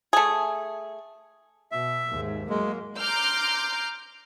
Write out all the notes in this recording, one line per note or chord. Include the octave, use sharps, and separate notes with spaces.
A3 G#4
B2 E5
D#2 G#2
F#3 G#3 A#3
A#5 C6 D6 F6 G6